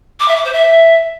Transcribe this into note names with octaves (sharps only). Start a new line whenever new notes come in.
D6
E5
D6
C5
E5